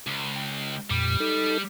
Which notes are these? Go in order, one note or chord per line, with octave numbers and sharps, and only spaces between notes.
C#2
G5
F2 A#2 G3
D#4 A4